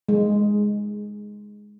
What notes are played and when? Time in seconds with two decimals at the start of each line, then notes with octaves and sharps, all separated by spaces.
0.09 G#3